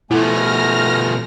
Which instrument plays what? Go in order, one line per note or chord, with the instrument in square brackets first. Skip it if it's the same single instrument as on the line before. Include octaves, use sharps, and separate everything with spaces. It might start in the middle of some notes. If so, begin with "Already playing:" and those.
[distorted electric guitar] B2 F3 [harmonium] A3 G#5 [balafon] E4 A4 [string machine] F6 A#6